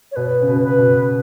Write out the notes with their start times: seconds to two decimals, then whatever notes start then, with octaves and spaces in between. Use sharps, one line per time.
0.12 C#5
0.16 B2 B4
0.42 C#3
0.47 B2
0.63 B4
0.78 B2